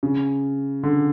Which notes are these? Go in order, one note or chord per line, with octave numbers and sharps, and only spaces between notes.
C#3
D3